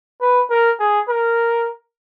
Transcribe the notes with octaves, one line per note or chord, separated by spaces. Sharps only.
B4
A#4
G#4
A#4